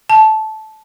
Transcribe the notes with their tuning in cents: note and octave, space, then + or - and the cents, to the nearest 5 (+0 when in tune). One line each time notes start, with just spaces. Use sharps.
A5 -15